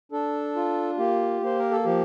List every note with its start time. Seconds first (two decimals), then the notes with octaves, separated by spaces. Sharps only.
0.12 D4 A4
0.56 F4
0.98 A#3 G4
1.41 A#3 C5
1.59 A#4
1.71 A4
1.85 F3 G4